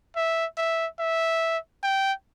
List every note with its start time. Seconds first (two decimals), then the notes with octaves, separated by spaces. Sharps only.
0.16 E5
0.57 E5
0.99 E5
1.83 G5